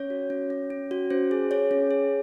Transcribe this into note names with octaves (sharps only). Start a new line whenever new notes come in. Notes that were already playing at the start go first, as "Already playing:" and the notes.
Already playing: C#4 C#5
F#4
C#4
C#4
C#4
F#4
C#4 C5
G#4
G#4 C#5
C#4
G#4